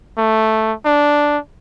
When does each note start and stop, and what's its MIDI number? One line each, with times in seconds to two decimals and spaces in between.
0.18 0.73 57
0.85 1.38 62